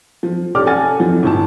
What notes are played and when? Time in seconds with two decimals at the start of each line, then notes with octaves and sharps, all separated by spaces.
0.23 F3
0.55 G4 A4 C#5 D5 D6 F6
0.66 A4 F#5 G#5 A6
1.00 F2 E3 F3
1.23 G1 A2 E4 A5